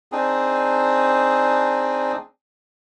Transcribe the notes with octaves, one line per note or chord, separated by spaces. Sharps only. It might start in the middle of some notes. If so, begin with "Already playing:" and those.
C4 D4 D#4 G#4